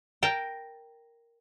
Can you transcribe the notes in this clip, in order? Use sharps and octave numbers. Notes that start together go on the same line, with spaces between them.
A#4 G5 A5